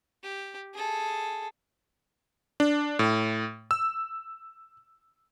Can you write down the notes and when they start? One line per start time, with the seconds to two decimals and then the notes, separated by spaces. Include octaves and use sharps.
0.24 G4
0.74 G#4 A4
2.60 D4
2.99 A2
3.71 E6